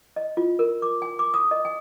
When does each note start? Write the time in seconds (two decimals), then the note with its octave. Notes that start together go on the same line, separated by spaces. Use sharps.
0.16 D#5
0.37 F4
0.59 A#4
0.82 D6
1.02 G#5
1.19 D6
1.34 D#6
1.51 D#5
1.65 G#5